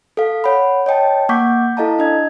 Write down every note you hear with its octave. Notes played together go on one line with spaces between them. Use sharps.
A4 F5
C#5 F#5 B5
C#5 D#5 G5 A5
A#3 F#5 C#6 D6 G6 B6
E4 A4 D#5 F5 A5 A#5
D4 D#5 G#6